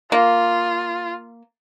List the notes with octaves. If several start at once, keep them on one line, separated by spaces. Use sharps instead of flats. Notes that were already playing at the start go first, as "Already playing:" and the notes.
A#3 F4